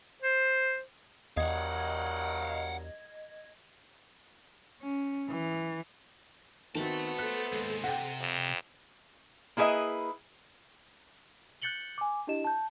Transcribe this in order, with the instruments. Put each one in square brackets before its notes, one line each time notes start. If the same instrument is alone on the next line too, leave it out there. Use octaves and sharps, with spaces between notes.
[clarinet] C5
[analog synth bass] E2 [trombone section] G2 F#3 A#4 [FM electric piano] D#5 G#6 [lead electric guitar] F5 F#5
[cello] C#4
E3
[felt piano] D#3 [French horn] B3 [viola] C4 F#4 [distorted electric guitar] E5 A5
[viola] A4 C5 [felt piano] F#6
[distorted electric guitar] D#2 G#3
[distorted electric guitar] C3 [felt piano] F#5 G5
[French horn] F2
[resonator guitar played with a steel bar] A#3 E4 G#4 B4 D#5 E5
[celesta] F#6 G6 A6 C#7 F#7 G7
G#5 D6
D4 E4 G4 D#5 E7
A5 G6